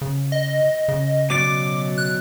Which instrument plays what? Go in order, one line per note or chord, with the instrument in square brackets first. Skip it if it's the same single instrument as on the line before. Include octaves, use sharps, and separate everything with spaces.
[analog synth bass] C#3
[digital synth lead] D#5
[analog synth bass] C#3
[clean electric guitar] B2 F#3 D5 [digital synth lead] D6
[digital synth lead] F#6